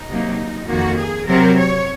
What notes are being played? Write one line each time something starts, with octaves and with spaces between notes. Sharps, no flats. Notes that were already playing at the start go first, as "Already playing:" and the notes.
Already playing: D#4
C3 F#3 A#3
F2 D#3 A#3 F#4
G#4
C3 F#3 C4 A#4
C#5